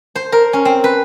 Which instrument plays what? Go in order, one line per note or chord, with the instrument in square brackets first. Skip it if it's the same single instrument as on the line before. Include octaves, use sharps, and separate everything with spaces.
[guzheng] C5
A#4
C#4
C4
B4